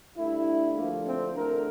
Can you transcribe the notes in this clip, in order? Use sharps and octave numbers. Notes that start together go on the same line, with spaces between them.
G2 D3 A3 E4
D2 D3 F3 A3 A#3
C4
E2 D3 A3 A#4